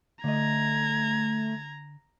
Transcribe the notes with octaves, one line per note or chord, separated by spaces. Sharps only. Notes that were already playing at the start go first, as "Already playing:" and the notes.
D3 A3 D#5 A#5 G#6